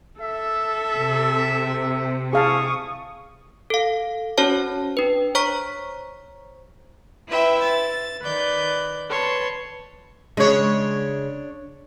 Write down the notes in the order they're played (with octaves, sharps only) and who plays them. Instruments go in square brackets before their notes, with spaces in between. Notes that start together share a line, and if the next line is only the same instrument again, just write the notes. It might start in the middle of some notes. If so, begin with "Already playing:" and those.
[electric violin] A4 [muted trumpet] E5
[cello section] C3
[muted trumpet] E4 [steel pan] G#4 F5 A5 [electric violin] C#6 D#6
[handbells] A4 F5
C#4 F#4 C5 C#5 A5
D4 B4
C5 C#5 A#5 C#6 B6
[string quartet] E4 B4 C5 E5 G5
A6
D#3 B4 D5 G6
B4 C#5 A5 C6
[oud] C#3 G#3 [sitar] D4 C#5